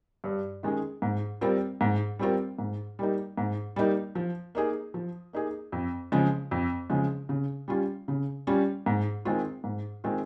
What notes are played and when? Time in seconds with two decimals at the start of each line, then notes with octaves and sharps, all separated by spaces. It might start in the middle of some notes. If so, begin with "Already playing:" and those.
0.24 G2
0.63 D#3 G#3 C#4 G#4
1.02 G#2
1.41 G3 C4 F4 A#4
1.81 G#2
2.19 G3 C4 F4 A#4
2.59 G#2
2.99 G3 A#3 D#4
3.38 G#2
3.76 G3 A#3 D#4
4.15 F3
4.55 A#3 D#4 G#4
4.94 F3
5.33 A#3 D#4 G#4
5.72 F2
6.12 C#3 F3 G#3
6.51 F2
6.90 C#3 F3 G#3
7.29 C#3
7.68 G3 C#4 F4
8.08 C#3
8.47 G3 C#4 F4
8.86 G#2
9.25 D#3 G#3 C4 F4
9.64 G#2
10.04 D#3 G#3 C4 F4